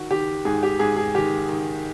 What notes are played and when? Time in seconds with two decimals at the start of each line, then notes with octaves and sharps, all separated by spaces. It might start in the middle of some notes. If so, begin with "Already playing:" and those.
Already playing: D#3 F#4
0.11 D#3 G4
0.45 G#2 G#4
0.63 G4
0.79 G#2 G#4
0.96 G#4
1.14 D#3 G4
1.49 D#3